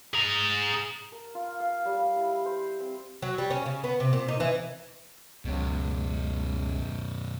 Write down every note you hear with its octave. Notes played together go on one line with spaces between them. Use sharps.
G#4 A#5
A#4
F4
F5
G3
F5
E4
C5
C4
F#3
G3
C#4
C#3
B3
C3
A#2
D#4
E3
C#2 F#2 B2